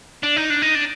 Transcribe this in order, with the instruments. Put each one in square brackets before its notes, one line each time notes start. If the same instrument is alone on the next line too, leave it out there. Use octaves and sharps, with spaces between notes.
[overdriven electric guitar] D4
D#4
D4
D#4
D4